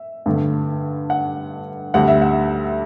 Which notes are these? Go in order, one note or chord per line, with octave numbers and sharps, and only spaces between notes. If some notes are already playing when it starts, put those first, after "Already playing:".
Already playing: E5
G2 D3 A3
F#5
D2 D3 G3 F#5
E5
F#5